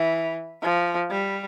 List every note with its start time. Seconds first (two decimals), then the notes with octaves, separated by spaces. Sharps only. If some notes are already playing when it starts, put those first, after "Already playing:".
Already playing: E3
0.62 F3
1.11 G3